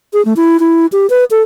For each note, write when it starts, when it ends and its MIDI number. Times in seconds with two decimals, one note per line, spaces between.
0.13 0.24 68
0.25 0.33 57
0.36 0.60 64
0.60 0.86 64
0.92 1.07 67
1.10 1.24 71
1.31 1.42 69